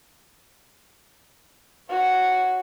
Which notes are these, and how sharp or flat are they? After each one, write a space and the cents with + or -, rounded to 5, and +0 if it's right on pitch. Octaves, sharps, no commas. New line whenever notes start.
F#4 +0 C#5 +0